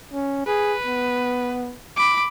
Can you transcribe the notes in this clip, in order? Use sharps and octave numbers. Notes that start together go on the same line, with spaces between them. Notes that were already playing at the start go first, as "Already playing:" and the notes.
C#4
G#4 B4
B3
B5 D6